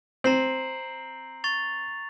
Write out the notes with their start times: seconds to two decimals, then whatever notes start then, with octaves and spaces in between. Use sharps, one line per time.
0.24 C4 A#5 C7 F#7
1.44 C#6 A6 F7